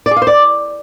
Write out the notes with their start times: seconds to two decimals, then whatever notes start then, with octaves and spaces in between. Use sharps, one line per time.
0.06 D5
0.11 G#4
0.16 F5
0.22 C5
0.27 D5